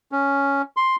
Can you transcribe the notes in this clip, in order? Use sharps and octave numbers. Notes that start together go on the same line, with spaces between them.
C#4
C6